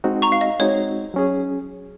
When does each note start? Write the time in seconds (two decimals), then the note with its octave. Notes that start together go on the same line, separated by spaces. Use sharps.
0.04 G#3 C4 D#4 F#4
0.22 A#5 C#6
0.32 F5
0.41 D#5
0.59 G#3 C4 D#4 F#4 C#5
1.14 F#3 C#4 G#4